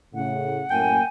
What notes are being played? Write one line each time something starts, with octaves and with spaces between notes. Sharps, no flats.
A2 C#3 F#5
F#2 A2 A#3 G5 G#5